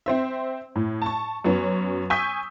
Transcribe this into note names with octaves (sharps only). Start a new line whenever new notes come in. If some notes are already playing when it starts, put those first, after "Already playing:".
C4 C5 E5
A2
A5 C#6
F#2 F#3 B3 C#4
G#5 C#6 D#6 E6 G6 B6